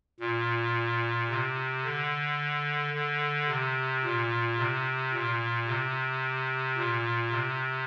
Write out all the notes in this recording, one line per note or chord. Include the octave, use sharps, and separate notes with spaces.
A#2
C3
D3
D3
C3
A#2
C3
A#2
C3
A#2
C3